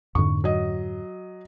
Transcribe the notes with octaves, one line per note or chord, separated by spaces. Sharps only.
F2 G#2 D3 C#6
F#3 D#5